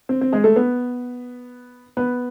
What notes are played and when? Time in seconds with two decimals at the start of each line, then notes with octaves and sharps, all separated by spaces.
0.09 C4
0.21 C4
0.33 G#3 G#4
0.44 A3 A4
0.56 B3 B4
1.97 B3 B4